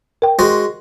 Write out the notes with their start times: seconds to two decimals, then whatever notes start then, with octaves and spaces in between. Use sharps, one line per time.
0.22 A#4 G5
0.39 G#3 F#4 C5